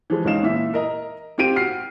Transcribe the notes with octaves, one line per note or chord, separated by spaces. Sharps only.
E3 F3 G#3
C#2 C#4 D#4 F5 E7
A#2 E3 E5
A#4 D#5 A#5
C4 F4 G4 D7 D#7
F#4 F6 C7